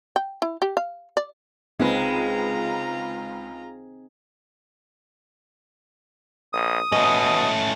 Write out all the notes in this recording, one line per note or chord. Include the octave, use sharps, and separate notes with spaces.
G5
E4
G4
F5
D5
C#2 G#3 C4 D#4 F4 B4 A#5
A#1 D#6
B2 A3 C#4 D#5